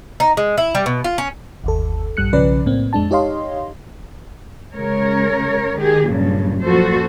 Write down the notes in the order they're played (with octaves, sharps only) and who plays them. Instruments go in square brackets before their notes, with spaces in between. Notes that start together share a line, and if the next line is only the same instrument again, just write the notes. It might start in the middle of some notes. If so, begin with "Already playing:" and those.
[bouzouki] D#4
G#3
E4
G3
B2
F4
C#4
[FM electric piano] G1 D#2 A4
A#1 G2 G3 F#6 C#7
B1 C#3 F3 C#4 B4 D5
A2 A#3 C4
F2 G#3 D4 A5
D#4 G4 C#5 D#5 F5 C6
[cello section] C#3 G#3 A#4 C#5
D#3 G4 G#4
G2 A#2 C#3 F#3
F#2 A#2 F3 F#4 A4 C5